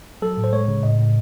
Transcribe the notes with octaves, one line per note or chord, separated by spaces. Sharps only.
F#3 A4
A2
C5
G#3 C#5
C#3
A2 D#5
A2